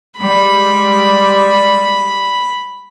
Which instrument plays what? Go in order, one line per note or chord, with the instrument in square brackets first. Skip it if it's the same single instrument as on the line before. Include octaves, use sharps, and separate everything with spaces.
[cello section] G3 G#3 [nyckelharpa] B5